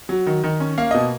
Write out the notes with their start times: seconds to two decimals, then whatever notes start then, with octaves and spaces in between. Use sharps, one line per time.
0.09 F#3
0.26 D#3
0.44 D#3
0.60 C#4
0.78 A#3 F5
0.91 B2 D#5